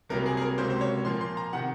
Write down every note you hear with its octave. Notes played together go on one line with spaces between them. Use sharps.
C2 C3 F#3 A#3 A#4
G#4
G#4
A#4
C#2 C3 F#3 A#3 C5
C5
C#5
A#2 F3 A#3 C6
C6
A#5
C3 D#3 F#5